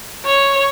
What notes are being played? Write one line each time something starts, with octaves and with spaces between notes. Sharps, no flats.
C#5